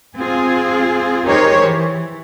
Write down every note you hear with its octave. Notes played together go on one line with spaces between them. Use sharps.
C4 F4 G#4
D#4 G4 G#4 A#4 C5 C#5
E3